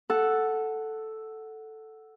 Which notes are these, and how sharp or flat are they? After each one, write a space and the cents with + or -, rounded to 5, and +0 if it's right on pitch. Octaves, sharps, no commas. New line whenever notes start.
A4 +0 F#5 +0